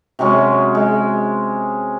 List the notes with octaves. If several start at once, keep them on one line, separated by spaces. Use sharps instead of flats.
C3 F#3 G#3 C#4
G#3